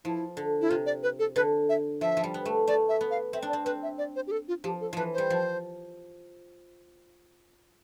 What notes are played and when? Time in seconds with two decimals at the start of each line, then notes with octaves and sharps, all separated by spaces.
0.05 F3 E4
0.37 D3
0.61 E4
0.70 C3 F4
0.86 D5
1.03 B4
1.19 A4
1.36 D3 B4
1.69 E5
2.01 F3 E5
2.17 F3
2.24 G3
2.34 B3
2.45 A3
2.68 A3 D5
2.89 E5
3.01 B3
3.11 F5
3.33 C4 E5
3.42 D4
3.49 D5
3.53 C4
3.65 C4 B4
3.83 E5
3.98 D5
4.16 C5
4.27 G4
4.31 A4
4.48 F4
4.64 F3 G4
4.81 A4
4.93 E3 F3 B4
5.13 G3 C5
5.30 F3